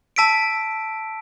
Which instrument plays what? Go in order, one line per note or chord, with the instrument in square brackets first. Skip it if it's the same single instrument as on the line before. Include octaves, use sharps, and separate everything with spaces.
[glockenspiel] A5 E6 B6 D7